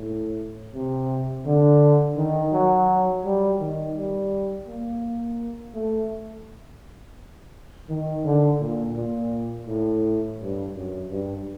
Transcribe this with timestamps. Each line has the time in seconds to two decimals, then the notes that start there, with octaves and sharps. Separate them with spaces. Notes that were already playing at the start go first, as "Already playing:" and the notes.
Already playing: A2
0.74 C3
1.46 D3
2.17 D#3
2.53 F#3
3.25 G3
3.60 D#3
3.96 G3
4.67 A#3
5.74 A3
7.89 D#3
8.24 D3
8.60 A#2
8.96 A#2
9.67 A2
10.38 G2
10.74 F#2
11.10 G2